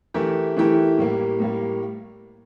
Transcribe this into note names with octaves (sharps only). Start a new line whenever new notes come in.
E3 A3 E4 G4 A#4
E3 A3 E4 G4 A#4
A2 G3 A#3
A2 G3 A#3